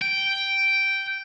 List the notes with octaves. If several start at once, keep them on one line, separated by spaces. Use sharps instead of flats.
G5